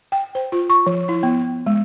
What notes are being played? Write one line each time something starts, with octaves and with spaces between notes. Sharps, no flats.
G5
C5
F4
C#6
F3
E4
B3
G#3